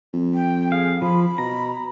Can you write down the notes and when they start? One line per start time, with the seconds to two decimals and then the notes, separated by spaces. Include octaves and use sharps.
0.13 F2
0.34 G5
0.72 G#4 F5
1.02 F3 B5
1.38 B2 A#5